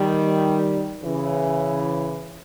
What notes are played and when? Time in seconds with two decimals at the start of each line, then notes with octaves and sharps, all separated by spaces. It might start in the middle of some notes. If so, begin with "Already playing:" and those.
Already playing: D#3 G3
1.03 C#3 E3